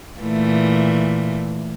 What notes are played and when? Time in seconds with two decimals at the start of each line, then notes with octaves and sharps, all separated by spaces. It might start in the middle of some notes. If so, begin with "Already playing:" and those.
0.19 A#2 E3 A3